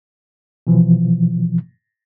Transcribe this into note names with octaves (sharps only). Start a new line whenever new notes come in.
B2 E3 F3